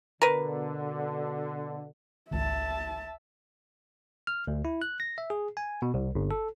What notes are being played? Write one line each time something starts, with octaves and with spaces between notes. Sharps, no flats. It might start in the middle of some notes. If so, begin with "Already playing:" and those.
B2 D3 A#4 B4
G#1 C#2 E5 A5
F6
D2
E4
F#6
A#6
E5
G#4
G#5
B2
C2
G1
A4